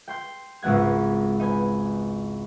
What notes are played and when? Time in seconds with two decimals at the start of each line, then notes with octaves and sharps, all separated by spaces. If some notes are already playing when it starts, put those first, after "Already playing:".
0.08 G5 C6 G6
0.62 G#1 C#2 B3 F#5 G#6
1.40 D#4 B4 G#5